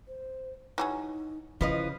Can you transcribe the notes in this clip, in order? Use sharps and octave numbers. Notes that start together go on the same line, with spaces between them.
C5
E3 F#3 D#4 G#4
C#3 F3 E4 B4 D#5